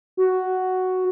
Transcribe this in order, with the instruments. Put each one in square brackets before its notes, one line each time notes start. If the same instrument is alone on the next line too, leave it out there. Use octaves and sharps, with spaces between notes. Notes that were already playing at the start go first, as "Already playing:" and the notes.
[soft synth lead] F#4